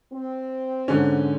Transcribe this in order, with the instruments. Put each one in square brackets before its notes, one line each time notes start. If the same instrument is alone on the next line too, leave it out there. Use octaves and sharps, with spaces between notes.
[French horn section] C4
[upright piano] G#2 D3 C#4